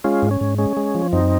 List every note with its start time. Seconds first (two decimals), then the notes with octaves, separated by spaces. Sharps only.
0.04 G#3 C#4 F4
0.22 G#2
0.31 C#4
0.41 G#2
0.58 G#3 C#4
0.77 G#3
0.95 F3
1.13 F#2 C4 D#4